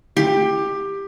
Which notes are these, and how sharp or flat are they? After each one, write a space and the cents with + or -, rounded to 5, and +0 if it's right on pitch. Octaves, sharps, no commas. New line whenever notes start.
G4 +15